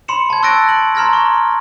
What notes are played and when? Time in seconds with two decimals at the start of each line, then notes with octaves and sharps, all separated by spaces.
0.08 B5 C6 C#7 E7
0.30 A5 G#6
0.43 C#6 E6 F#6 A6 A#6 D7
0.69 F#7
0.95 A#5 C6 F6 G#6 A#6
1.13 C#6